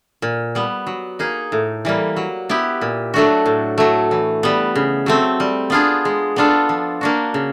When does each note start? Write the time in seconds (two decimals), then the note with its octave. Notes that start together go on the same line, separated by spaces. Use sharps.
0.22 A#2
0.55 G3 B3
0.87 F#3
1.19 A#3 D#4 G#4
1.52 A2
1.85 E3 G3 A#3
2.17 F#3
2.49 B3 E4 G4
2.81 A#2
3.14 F#3 A3 D4 F#4
3.46 A2
3.78 F#3 A3
4.11 E3
4.43 G3 B3
4.75 C#3
5.06 F#3 A3 C4
5.40 G3
5.70 B3 D4 F4 G#4
6.05 G#3
6.36 B3 D4 F4 A4
6.69 F3
7.01 A#3 D4 F#4
7.34 C#3